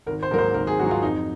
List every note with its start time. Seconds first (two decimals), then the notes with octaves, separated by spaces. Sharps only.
0.06 G#1 A#4
0.23 C5
0.31 G#2 F#3 A#3 A#4
0.38 C5
0.54 G#1 A#4
0.67 G#4
0.79 G#2 F#3 A#3 F#4
0.91 F4
1.03 F2 D#4